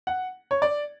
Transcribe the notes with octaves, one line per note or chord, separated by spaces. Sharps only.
F#5
C#5
D5